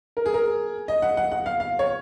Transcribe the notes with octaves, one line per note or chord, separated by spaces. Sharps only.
A#4
G#4
A#4
D#5
F#5
F#5
F#5
F5
F5
C#5